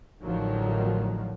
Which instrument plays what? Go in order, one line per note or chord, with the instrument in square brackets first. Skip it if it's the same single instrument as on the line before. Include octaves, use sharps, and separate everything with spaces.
[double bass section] A1 A2 D3 D#3 F3 F#3